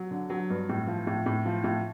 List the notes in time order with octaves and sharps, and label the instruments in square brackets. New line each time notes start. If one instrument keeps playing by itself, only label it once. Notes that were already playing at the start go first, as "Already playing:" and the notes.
Already playing: [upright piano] F#3
D3
F#3
G2
A2
F3
A2
A2
F3
A2